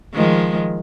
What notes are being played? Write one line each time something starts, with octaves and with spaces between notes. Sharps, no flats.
D#3 F3 G#3